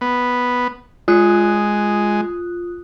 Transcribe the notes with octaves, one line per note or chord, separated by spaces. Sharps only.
B3
G#3 F4 D#6 F#6